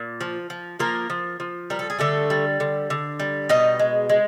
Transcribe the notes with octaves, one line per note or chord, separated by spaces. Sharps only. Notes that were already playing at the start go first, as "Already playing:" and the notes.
Already playing: A#2
F3
F3
F3 A#3 A#4
F3
F3
G3 A#4
A4
G#4
D3 A3 A4
G3
D3
D3
G3
B2 D#4 D#5
G#3
G#3